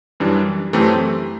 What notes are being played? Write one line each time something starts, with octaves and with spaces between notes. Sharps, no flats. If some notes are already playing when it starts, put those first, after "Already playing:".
F#2 E3 G3 D4
F#2 E3 A3 C4 G4